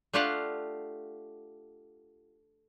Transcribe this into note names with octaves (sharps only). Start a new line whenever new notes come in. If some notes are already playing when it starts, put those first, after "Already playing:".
A3 D4 F4 G4 F5 F#5